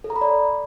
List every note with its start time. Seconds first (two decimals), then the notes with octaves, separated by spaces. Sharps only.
0.04 A4
0.10 A#5
0.16 B5
0.21 D5